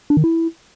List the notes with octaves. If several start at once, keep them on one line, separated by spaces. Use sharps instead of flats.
D4
D#3
E4